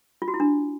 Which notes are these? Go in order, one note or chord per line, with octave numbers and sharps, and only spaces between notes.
F4
F#4
E4
D4